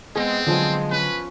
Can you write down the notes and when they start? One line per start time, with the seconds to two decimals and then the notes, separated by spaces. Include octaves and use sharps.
0.16 G#3 B3 C4 G#4
0.47 D3 F3 F#3 G#3 G#5
0.91 C#4 B4